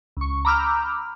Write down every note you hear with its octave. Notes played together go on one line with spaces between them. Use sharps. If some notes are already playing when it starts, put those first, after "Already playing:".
C#2 C#6
A#5 B5 D6 E6 F6 G6